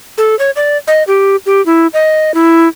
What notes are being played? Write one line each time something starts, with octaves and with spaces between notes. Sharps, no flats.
A4
C#5
D5
D#5
G4
G4
E4
D#5
E4